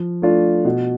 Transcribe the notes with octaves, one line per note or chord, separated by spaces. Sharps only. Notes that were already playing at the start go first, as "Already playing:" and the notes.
Already playing: F3
A3 D4 F4
B2